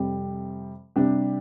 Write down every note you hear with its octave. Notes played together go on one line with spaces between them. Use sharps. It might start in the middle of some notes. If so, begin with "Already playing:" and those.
Already playing: F2 C3 G3
C3 G3 D4 G4